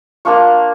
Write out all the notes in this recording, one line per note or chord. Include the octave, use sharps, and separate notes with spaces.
A#3 D4 F4 C#6